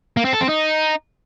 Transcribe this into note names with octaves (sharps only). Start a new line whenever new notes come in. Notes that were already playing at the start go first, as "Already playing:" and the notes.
A#3
C4
A4
C4
D#4